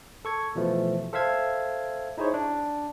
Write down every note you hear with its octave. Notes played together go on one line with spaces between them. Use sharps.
A4 C#6 G#6
B2 E3 F3 A3
A4 C5 E5 F5 E6 G#6
D#4 E4 G#4 C5 C#5
D4